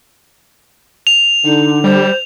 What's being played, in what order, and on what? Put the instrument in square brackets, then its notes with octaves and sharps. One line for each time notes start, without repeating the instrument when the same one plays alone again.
[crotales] F7
[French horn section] D3 [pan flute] D#4
[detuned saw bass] G3 [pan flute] C5